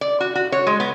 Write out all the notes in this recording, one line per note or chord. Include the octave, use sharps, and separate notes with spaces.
D5
F#4
F#4
C#5
G#3
B3